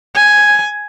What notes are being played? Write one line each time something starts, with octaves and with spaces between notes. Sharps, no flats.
G#5